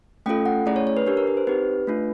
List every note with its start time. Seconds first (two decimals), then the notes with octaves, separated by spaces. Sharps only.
0.26 A3 C#4 F4 A4 G5
0.46 F#5
0.66 A3 C#4 E4 G#4 D5
0.76 C#5
0.87 C#5
0.97 B4
1.07 D4 G4 A#4
1.17 A#4
1.27 B4
1.37 C5
1.47 C4 D#4 G4 B4
1.87 A3 D4 F4